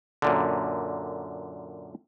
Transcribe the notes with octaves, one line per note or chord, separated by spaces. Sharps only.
F#2 A#2 D3